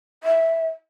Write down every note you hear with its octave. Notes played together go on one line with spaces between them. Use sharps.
E5